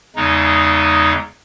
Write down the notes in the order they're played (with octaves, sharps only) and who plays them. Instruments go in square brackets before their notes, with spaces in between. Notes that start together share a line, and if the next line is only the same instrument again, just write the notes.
[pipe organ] E2 C#3 G#3 D#4